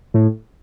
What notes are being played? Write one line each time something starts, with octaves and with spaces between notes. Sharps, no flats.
A2